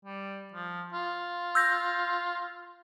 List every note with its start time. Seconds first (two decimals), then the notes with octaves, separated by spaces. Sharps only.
0.05 G3
0.53 F3
0.94 F4
1.55 E6 G6 A#6